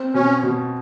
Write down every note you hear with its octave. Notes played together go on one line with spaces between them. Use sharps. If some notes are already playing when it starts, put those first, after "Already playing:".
Already playing: C4
B2 C#4
B2